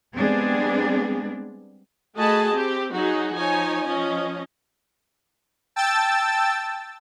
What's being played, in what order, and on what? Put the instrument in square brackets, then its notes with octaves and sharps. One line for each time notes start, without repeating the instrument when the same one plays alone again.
[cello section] G3 G#3 B3 C4 D4 G#4
[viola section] A3 F#4 G#4 D#5 A5 B5
C4 G4
F#3 D#4 F#4 G#4
F3 D#4 C#5 G#5
F3 C#4 D#5
[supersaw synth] G5 A5 E6 A6